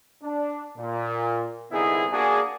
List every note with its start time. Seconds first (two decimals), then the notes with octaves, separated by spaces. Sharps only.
0.23 D4
0.78 A#2
1.71 C2 D3 B3 D#4 E4 G#4
2.12 A#3 D4 F#4 G#4